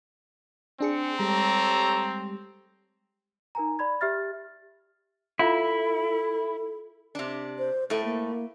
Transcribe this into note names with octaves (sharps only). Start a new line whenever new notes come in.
C4 D4 G#4 C#7
G3 G#3 G4 A4 C#5 A#5
D#4 A#4 G#5 A#5
D5 B5 G#6
G4 E5 F6 A6
E4 F4 A4 F5 B5
C3 D4
C5
A2 A3 A4
A#3